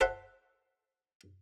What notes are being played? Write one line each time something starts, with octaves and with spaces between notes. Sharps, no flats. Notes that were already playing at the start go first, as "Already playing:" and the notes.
A4 C5 E5 F#5